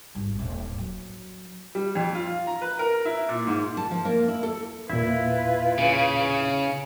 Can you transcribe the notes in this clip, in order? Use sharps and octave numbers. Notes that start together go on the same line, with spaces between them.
G#1 G3
D#1 A2
F#3
G3
F2
F4
A#5
B4
A#4
E4
A#2
G#2
A5
F3
A#3
E4
A4
E2 A#2 E4 F4 B4
C#3